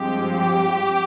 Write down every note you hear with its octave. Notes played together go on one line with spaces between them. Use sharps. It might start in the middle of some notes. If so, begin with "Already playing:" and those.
Already playing: G2 F3 G#3 C4 G4
G4